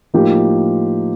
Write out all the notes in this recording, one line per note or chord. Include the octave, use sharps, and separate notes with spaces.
A2 F3 A#3 D#4 G4